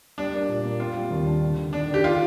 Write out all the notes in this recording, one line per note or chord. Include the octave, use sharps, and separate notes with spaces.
G3 D4
A#3
A#2
A#3
C4 F4
G3
D#2
D4
D3
D3
D#3 D4
D#3
G4
D#3 F4